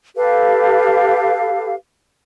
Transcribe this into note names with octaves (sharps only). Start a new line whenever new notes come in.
G4 A4 B4 F5